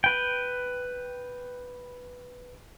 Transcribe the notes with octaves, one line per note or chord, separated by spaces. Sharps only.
B4 G5